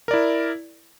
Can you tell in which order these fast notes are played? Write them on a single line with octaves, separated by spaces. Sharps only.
A#4 D5 E4